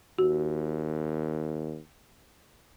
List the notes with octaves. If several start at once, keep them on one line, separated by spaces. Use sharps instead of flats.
D#2 F#4